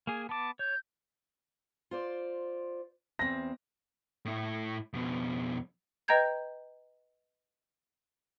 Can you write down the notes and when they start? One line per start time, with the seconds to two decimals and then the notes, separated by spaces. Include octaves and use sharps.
0.07 A#3 G#4 G#5
0.29 B3 A5 D6
0.59 C#5 G6
1.91 F4 C5 D5
3.19 E2 C4 A#6
4.25 A2 E4
4.93 F2 B2
6.08 B4 D#5 G5 A#5 G6 G#6